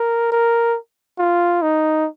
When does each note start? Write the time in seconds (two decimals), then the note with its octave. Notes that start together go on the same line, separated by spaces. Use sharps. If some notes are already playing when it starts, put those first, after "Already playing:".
Already playing: A#4
0.32 A#4
1.19 F4
1.62 D#4